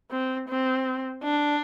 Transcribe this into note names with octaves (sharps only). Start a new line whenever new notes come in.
C4
C4
D4